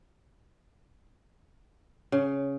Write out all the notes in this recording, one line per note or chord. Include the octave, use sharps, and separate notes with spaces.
C#3